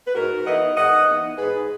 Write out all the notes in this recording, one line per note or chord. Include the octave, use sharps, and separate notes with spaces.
B4
G#2 F#4 A#4
E3 B3 D#4 D#5 F#5
G#2 D#5 F#5
E3 B3 D#4
G#2 G#4 B4